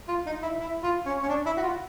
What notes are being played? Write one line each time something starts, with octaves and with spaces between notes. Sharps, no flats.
F4
D#4
E4
E4
F4
C#4
C#4
D4
E4
F#4
F4